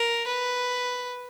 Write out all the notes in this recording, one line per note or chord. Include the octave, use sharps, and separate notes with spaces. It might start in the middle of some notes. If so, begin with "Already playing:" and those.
Already playing: A#4
B4